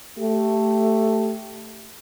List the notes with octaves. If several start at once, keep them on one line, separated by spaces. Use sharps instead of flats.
A3 G4